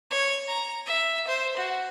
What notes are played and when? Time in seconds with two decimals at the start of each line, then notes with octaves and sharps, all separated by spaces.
0.11 C#5
0.48 A#5
0.86 E5
1.28 C5
1.57 F#4